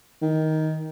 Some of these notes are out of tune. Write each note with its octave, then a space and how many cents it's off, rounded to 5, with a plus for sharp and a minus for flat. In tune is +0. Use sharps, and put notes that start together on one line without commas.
D#3 +10